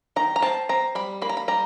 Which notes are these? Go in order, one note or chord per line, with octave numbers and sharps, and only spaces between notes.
D#3 A#5
A#5
C4 A5
C4 A#5
G3 B5
A#3 B5
A#5
B5
G3 A#5